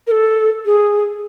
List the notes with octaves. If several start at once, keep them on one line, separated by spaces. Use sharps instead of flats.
A#4
A4
G#4